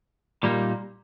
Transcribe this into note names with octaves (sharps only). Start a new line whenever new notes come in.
A#2 G3 A#3 D#4